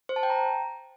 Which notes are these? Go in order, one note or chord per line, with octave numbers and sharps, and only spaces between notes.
C5
A5
G5
A#5